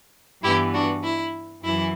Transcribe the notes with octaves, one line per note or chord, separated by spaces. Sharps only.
G2 E3 B3 E4 G4
D4 F#4
E4
F#2 E3 E4